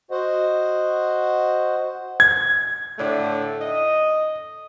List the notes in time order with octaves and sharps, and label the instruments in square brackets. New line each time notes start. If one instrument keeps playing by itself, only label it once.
[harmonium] F#4 C5 D#5 F#5
[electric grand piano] G#6
[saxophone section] A2 D3 A3
D#5